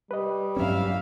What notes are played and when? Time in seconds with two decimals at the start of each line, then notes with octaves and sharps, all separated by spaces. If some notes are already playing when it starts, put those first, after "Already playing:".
0.11 G3 B4 D#5
0.57 G2 F#3 C#4 E5 F5